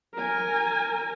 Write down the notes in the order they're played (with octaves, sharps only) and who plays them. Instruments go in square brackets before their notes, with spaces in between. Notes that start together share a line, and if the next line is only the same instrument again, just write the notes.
[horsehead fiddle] A#4 G#5